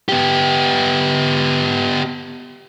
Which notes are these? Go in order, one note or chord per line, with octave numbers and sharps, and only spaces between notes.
B3 G4